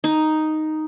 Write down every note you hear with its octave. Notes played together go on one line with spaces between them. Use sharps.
D#4